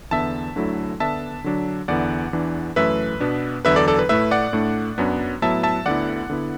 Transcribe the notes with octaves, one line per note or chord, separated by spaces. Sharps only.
E2 D3 B3 E5 A5
D2 D3 F#3 A3 E4
D3 B3 D4 E5 A5
D3 F#3 D4
E2 D3 B3 E4 D5 F#5
E2 E3 D4
F#2 E3 A3 B4 E5
B2 B3 D4
E2 D3 F#3 B3 E4 B4 E5
A4 D5
A4 D5
B4
A2 A3 E4 B4 E5
D5 F#5
A2 A3 D4
F#2 F#3 B3 D4
A2 F#3 B3 E4 E5 A5
E5 A5
D2 D3 B3 E4 D5 F#5
D3 B3 E4